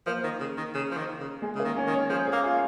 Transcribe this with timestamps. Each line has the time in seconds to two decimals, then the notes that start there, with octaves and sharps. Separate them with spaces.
0.07 F3 A#3
0.24 D#3
0.40 C#3
0.58 D#3
0.75 C#3
0.91 F3
0.97 D#3
1.20 C#3
1.42 G#3
1.55 C#3 A#3
1.65 D#3
1.76 C#4
1.87 D#3
1.93 C#5
2.10 F3 G#4
2.27 G#4
2.33 A#3
2.44 F4